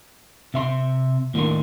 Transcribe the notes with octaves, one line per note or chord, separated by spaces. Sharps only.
C3 E5 C6
D#2 A2 D3 D#3 A#3 C6